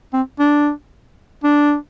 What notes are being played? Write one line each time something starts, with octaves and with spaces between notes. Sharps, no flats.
C4
D4
D4